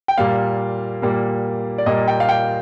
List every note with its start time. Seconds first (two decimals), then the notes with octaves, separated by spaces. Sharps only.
0.08 G5
0.18 A#2 G3 A#3 F5
1.02 A#2 G3 A#3
1.78 D5
1.86 A#2 G3 A#3 D#5
2.08 G5
2.20 F5
2.29 G5